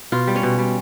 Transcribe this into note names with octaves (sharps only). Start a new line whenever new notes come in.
B2 F4
G3
C#4
B2
G3